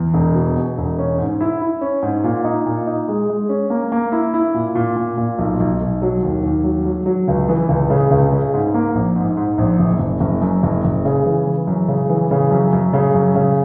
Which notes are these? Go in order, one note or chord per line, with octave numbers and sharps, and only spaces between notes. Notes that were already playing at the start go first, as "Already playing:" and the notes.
Already playing: E2
E1
B2
B2
E1
C#4
G#2
E4
E4
C#4
G#2
A#2
D#4
A#2
D#4
G#3
G#3
C#4
A#3
A#3
E4
E4
A#2
A#2
A#2
A#2
B1
B1
B1
F#3
D#2
D#2
F#3
F#3
F#3
C#2
E3
C#2
C#3
C#2
C#3
G#2
A#3
A#1
G#2
G#2
A#1
F#1
F#1
F#1
F#2
F#1
F#1
C#3
E3
E3
F#2
C#3
E3
C#3
F#2
F#2
C#3
F#2
C#3